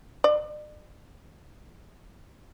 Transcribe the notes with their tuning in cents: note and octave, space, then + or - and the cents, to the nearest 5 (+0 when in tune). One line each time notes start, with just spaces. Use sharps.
D5 +45